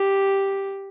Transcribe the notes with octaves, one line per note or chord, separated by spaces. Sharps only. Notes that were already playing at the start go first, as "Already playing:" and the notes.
Already playing: G4